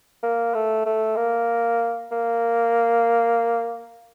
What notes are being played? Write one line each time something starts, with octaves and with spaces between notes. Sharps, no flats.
A#3
A3
A3
A#3
A#3